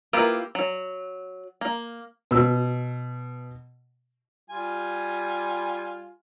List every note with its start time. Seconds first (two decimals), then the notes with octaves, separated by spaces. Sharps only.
0.13 A#3 E4 F4 G4 B4
0.55 F#3
1.61 A#3
2.31 B2 E6
4.50 G3 F4 G#5